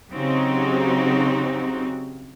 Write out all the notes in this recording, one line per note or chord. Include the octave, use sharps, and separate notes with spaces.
C#3 F#3 C4 D#4 F#4 G4